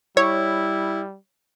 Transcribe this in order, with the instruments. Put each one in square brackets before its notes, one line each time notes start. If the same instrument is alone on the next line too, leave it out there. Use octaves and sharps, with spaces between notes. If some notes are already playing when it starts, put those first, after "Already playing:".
[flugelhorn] G3 [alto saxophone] E4 [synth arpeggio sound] C#5